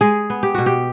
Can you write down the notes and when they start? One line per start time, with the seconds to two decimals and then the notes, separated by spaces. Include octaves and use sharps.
0.01 G#3 G#4
0.30 B3
0.43 G4
0.55 B2 F#4
0.66 G4